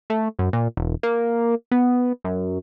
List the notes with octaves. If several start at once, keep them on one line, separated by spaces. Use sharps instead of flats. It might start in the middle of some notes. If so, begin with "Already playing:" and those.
A3
F#2
A#2
E1
A#3
B3
F#2